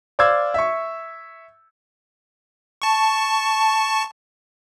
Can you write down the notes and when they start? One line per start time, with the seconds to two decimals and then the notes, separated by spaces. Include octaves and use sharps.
0.19 C5 D5 F5 D6 E6 G#6
0.54 E5 C#6
2.82 A5 C#6